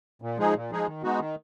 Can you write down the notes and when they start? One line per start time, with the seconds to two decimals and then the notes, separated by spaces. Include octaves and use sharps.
0.22 A#2
0.38 F3 G#3 D#4 G#4
0.55 A#2
0.71 F3 G#3 D#4 G#4
0.86 D#3
1.03 G#3 B3 D#4 F#4
1.19 D#3